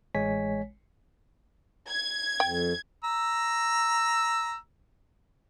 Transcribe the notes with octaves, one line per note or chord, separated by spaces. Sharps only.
A1 G#3 C#5 G#5 B6
G#6
F2 G5
A#5 E6